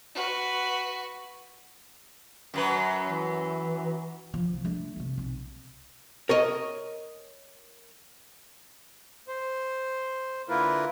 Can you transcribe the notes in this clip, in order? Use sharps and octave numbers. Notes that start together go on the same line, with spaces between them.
F#4 B4
F#2 F#3 B4
E3
F3
C2
A3 D4
C3 A3
B1 C4
A#4 C#5 D#5
C5
D3 A#3 E4 F4 A#4 B4